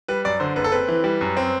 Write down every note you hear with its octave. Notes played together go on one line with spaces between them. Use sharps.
G3 B4
F#2 D5
D3 C5
F#1 B4
A4
C4 B4
E3
G3
F#2
C4